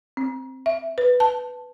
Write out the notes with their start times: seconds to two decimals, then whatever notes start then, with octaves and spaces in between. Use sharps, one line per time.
0.17 C4
0.66 E5
0.98 B4
1.20 A5